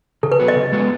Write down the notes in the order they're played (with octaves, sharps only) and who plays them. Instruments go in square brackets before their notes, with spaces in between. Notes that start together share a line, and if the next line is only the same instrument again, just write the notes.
[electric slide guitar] C#3 [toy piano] A4
[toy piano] B4
[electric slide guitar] F#3 B3 F#4
[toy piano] D#5
[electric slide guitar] C#3
G#3 B3 F#4